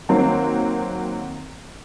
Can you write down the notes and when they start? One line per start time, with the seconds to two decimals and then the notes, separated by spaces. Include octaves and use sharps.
0.09 D#3 F#3 A#3 C4